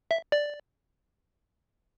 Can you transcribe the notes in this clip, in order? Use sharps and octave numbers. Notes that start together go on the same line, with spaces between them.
E5
D5